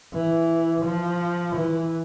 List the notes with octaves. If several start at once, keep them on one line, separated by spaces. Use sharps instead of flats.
E3
F3
E3